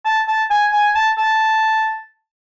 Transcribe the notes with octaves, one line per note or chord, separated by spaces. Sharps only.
A5
A5
G#5
G#5
A5
A5